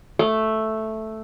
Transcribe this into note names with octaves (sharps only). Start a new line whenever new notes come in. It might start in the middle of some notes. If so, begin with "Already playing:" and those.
A3